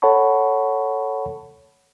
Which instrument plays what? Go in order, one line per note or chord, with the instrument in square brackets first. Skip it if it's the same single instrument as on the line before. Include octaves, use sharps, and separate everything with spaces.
[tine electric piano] A4 C#5 F#5 A5 B5 C#6